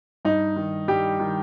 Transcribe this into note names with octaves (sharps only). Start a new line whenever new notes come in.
G2 D#4
D#3
G2 G3 G4
D#3